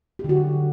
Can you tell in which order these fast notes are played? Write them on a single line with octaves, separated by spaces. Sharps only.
G4 D3 F#4